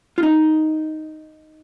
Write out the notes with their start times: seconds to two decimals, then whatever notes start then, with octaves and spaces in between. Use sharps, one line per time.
0.18 F4
0.23 D#4